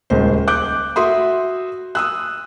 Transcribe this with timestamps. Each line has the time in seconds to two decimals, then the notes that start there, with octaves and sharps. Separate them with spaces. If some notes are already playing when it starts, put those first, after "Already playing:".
0.10 D#1 C#2 C5
0.48 D6 F#6 G6
0.96 F#4 E5 C6 D#6
1.95 D#6 E6 F#6